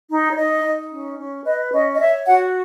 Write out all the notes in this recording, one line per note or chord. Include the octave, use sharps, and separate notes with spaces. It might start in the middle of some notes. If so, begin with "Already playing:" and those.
D#4
C#5
D#4 D#5
D#4
C#4
C#4
B4 D#5
C#4 D#5
D#5
C#5 E5
F#4 F#5